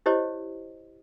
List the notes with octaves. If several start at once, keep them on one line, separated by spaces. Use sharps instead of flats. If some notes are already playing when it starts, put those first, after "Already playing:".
E4 G4 C5 C#5 D#5